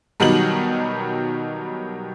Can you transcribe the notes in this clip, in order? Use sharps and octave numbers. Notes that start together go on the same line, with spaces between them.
B2 D#3 F#3 G3 D#4 F#7